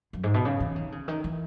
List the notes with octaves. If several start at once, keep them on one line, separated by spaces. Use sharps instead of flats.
F#2
G#2
B2
C#3
E3
D#3
C#3
D#3
E3